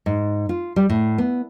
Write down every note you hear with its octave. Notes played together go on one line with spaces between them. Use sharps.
G#2
F4
G3
A2
B3